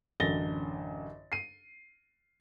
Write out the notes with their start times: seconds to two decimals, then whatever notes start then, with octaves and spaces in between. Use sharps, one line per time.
0.20 A1 F#2 D3 A6 A#6 G7
1.32 C7 D#7